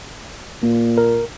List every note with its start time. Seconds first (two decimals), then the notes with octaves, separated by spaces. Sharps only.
0.63 A#2 A#3
0.98 A#4